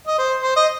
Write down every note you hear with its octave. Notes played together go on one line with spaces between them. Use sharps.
D#5
C5
C5
D#5